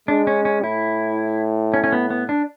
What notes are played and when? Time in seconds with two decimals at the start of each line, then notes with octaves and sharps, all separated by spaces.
0.08 G#3 D4
0.27 C#4
0.45 C#4
0.64 A2 E4
1.74 C#4
1.84 C#4
1.92 B3
2.10 B3
2.29 D4